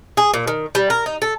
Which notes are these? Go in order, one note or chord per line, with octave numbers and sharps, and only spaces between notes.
G#4
A#2
D#3
G3
A#4
D#4
A4